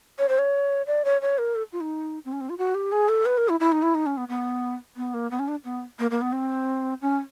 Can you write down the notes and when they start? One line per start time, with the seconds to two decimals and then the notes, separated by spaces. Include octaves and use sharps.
0.19 C#5
0.29 C5
0.38 C#5
0.87 D5
1.05 C#5
1.21 C#5
1.38 A#4
1.55 A4
1.72 F4
1.80 D#4
2.25 C4
2.32 C#4
2.41 C4
2.49 F4
2.58 F#4
2.75 G4
2.92 G#4
3.09 A4
3.25 B4
3.37 A#4
3.49 E4
3.60 E4
3.72 D#4
3.83 E4
3.95 D#4
4.06 C#4
4.17 B3
4.28 B3
4.96 B3
5.14 A#3
5.31 B3
5.39 C#4
5.48 D4
5.64 B3
5.99 A#3
6.11 A#3
6.21 B3
6.32 C4
7.02 C#4